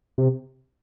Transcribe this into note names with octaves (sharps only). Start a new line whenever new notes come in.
C3